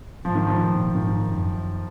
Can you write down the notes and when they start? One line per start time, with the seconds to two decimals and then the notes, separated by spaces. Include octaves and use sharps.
0.25 G#2 F3
0.35 D#3
0.47 F3
0.60 A#2
0.95 G#2 D#3
1.29 F#2